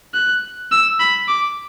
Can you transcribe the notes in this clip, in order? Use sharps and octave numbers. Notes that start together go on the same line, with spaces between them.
F#6
E6
B5
D6